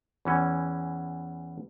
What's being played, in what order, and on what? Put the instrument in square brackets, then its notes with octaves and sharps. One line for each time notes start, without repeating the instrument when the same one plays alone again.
[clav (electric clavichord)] E2 E3 C#4